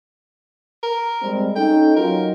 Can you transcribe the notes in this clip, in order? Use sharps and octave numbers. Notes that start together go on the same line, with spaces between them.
A#4
G3 G#3 C4
C#4 D#4 A4 G5
F#3 D#4 F4 A#4